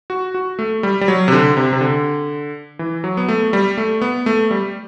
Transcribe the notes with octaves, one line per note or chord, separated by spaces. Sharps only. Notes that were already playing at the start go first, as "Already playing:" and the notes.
F#4
F#4
A3
G3
G3
F#3
C3
D3
C3
C3
D3
E3
F#3
B3
A3
G3
A3
B3
A3
G3